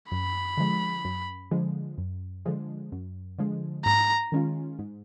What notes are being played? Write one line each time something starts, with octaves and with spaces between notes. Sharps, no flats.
F#2 B5
D3 F3 G#3
F#2
D3 F3 G#3
F#2
D3 F3 G#3
F#2
D3 F3 G#3
G#2 A#5
D#3 G#3 C#4 F4
G#2